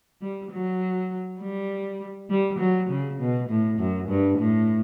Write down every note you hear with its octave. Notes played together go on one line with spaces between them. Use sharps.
G3
F#3
G3
G3
F#3
C#3
B2
A2
F#2
G2
A2